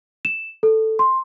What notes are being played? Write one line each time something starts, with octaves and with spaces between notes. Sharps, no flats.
E7
A4
C6